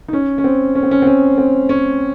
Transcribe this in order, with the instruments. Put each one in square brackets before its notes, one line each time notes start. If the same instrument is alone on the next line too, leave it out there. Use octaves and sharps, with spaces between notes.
[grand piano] D#4
C#4
C#4
C4
C#4
C4
C#4
C4
C#4
C4
C#4